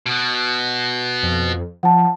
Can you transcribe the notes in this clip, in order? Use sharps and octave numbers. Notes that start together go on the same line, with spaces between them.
B2 B3
F2
F3 F#5 A5